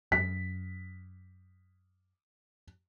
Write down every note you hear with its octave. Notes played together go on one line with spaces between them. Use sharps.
F#2 B6